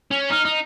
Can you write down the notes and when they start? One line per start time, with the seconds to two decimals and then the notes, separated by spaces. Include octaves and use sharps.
0.11 C#4
0.30 D#4 F6
0.45 D#4